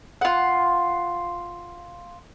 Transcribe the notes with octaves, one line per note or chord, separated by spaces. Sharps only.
F4 F#5